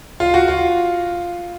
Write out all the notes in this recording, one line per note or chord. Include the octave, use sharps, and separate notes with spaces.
F4
F#4
F4